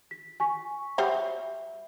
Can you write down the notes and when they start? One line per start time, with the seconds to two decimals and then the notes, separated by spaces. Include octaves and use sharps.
0.11 B6
0.40 G#5 C#6 B6
0.98 F#3 G3 C5 E5